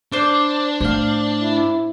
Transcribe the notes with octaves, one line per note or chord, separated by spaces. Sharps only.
D4 C5 D5
A2 C5 F5
E4